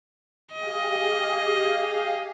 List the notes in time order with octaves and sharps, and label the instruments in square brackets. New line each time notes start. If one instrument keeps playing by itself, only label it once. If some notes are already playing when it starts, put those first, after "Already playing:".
[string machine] G4 G#4 F5 [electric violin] D#5